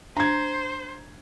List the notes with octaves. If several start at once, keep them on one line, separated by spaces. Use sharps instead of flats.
D4 C5 A#5 G#6